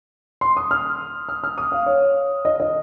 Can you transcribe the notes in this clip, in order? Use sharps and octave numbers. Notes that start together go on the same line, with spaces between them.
C6
D#6
F6
F6
F6
D#6
F5
C#5
D#5
D#5